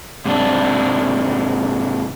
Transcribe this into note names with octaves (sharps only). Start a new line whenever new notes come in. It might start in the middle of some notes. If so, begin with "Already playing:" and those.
G#2 C3 D4